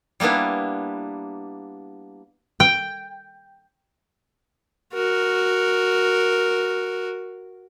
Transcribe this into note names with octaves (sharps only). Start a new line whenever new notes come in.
G3 A#3 B3 D4 E4
G5
F#4 A#4